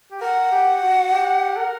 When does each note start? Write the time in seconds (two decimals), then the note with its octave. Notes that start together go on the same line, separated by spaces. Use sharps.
0.11 G4
0.20 A#4 F#5
0.51 G4
0.81 F#4
1.12 G4
1.57 A#4